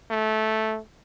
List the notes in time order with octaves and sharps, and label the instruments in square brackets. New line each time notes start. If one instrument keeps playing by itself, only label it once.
[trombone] A3